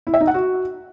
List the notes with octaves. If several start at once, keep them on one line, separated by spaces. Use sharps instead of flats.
E4
E5
D#4
F#5
F#4